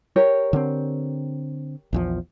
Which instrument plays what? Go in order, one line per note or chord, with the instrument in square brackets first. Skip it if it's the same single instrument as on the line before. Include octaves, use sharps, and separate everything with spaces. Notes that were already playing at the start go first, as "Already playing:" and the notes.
[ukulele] G4 A#4 C#5
[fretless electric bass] D3 C4
A#1 E2 F3